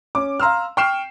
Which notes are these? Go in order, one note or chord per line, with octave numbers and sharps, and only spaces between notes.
C#4 D6
F5 A#5 C6 E6 F6
G5 C#6 F6 C7 E7